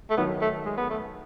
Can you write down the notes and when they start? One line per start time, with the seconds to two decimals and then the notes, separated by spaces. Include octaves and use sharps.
0.11 A3
0.17 D#3 F#3 B3
0.42 A3
0.65 G#3
0.77 B3
0.90 A3